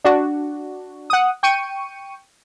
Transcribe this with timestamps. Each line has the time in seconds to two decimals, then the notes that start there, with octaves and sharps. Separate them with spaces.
0.04 D4 F#4
1.10 F#5 D#6
1.43 G5 C#6 C#7 D#7